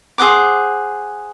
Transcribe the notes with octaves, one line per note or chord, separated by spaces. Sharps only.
G#4 C5 F#5 D6